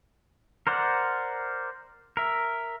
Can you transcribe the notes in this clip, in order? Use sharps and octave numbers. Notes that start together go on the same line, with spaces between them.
A#4 C5 D5 F#5
A#4 E5